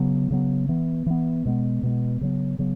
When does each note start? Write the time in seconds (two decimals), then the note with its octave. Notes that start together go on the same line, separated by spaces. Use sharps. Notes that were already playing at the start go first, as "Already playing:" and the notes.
Already playing: C#3 F#3 B3
0.31 C#3 F#3 B3
0.69 E3 B3
1.06 E3 B3
1.45 B2 G#3 B3
1.83 B2 G#3 B3
2.21 C#3 F#3 B3
2.59 C#3 F#3 B3